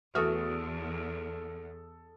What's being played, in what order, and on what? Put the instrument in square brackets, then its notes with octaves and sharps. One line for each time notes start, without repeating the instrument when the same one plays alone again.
[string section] E2 [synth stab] E3 A3 F#4 [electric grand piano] A4 D#6 F6